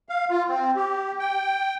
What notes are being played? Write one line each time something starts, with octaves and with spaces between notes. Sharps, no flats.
F5
F4
C4
G4
G5